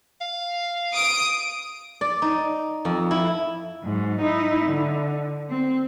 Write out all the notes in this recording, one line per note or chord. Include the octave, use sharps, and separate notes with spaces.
F5
D#6 D7
D5
D#4
F2
E4
G#2 F#3
D#4 E4
D3
C4